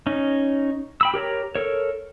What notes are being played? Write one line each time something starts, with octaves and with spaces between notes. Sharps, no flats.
C#4 D#4
G5 B5 E6
G4 A#4 C#5 A#5
A4 A#4 C#5